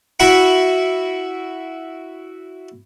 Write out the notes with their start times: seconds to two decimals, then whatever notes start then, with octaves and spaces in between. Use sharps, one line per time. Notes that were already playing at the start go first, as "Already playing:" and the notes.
0.20 E4 F#4 F#5 B5 C#6